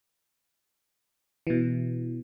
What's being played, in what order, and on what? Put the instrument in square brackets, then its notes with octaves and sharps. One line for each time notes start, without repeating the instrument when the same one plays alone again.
[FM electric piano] B2 E3